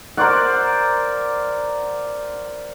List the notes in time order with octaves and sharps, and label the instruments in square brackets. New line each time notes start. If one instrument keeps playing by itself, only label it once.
[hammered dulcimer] A#4 C5 D5 F#5